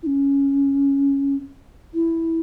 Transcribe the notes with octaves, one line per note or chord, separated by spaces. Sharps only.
E4
C#4
E4